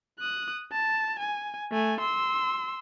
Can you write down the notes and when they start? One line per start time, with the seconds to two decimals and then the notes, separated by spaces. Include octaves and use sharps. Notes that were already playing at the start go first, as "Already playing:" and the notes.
0.19 D#6 F#6
0.72 A5
1.19 G#5
1.71 A3 G#5
2.00 C6 E6